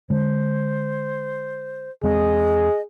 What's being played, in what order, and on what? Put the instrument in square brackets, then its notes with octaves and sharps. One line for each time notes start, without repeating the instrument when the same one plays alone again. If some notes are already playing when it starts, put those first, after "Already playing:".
[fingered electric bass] D3 G#3 [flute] C5
[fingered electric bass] E2 G#3 C4 [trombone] G#4 [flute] D#5